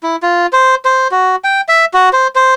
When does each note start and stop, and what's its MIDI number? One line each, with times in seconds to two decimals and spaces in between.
0.03 0.16 64
0.23 0.46 65
0.53 0.75 72
0.85 1.08 72
1.11 1.36 66
1.44 1.61 79
1.68 1.85 76
1.94 2.09 66
2.13 2.27 72
2.35 2.54 72